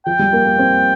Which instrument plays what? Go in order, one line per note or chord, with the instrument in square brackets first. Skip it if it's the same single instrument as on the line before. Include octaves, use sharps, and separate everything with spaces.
[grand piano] F3 [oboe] G5
[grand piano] G3
A#3
A#3
C4